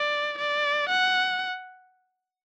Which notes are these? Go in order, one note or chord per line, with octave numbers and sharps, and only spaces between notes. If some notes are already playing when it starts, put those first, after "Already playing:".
Already playing: D5
D5
F#5